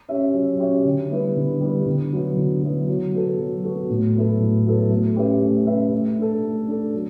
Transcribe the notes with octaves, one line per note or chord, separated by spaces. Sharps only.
C#4 G4 C#5 E5
F#3
C#4 G4 C#5 E5
D3
G3 B3 E4 B4
D3
G3 B3 E4 B4
D3
F#3 B3 E4
D3
F#3 B3 E4
F#3
B3 F#4 A4
F#3
B3 F#4 A4
A2
F#3 B3 E4 A4
A2
F#3 B3 E4 A4
A3
C#4 G4 B4 E5
A3
C#4 G4 B4 E5
A3
D4 A4
A3
D4 A4
F#3